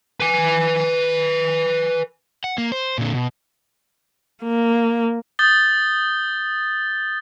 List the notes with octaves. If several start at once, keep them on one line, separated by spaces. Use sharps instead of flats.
B4 G#5
F#5
A#3
C5
A#2 D3
B2
A#3
D#6 G6 A6 G7